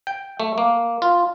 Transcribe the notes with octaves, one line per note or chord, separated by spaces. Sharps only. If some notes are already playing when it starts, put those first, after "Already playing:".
G5
A3
A#3
F4